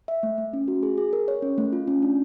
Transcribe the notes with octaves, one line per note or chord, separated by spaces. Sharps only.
E5
A3
A3
C#4
F#4
G#4
G#4
A#4
C#5
C#4
A3
F4
C#4
D4